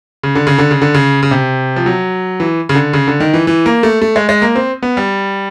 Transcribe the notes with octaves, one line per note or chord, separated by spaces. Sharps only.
C#3
D3
C#3
D3
C#3
D3
C#3
C#3
C3
F3
F#3
E3
C#3
D3
C#3
D3
D#3
E3
E3
A#3
A3
A3
G#3
G#3
A#3
C4
B3
G3